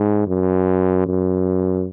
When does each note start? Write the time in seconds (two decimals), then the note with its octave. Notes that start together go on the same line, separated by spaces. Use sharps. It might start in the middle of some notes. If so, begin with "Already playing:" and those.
Already playing: G#2
0.27 F#2
1.06 F#2